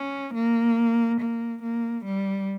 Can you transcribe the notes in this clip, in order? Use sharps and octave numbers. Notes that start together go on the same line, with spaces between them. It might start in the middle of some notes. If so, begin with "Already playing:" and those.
Already playing: C#4
A#3
A#3
A#3
G3